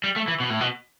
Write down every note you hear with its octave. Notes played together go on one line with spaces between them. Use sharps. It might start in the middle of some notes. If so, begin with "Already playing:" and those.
G3
A3
E3
B2
A2
B2